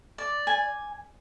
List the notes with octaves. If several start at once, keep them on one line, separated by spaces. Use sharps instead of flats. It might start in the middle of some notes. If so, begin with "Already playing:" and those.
D5
G#5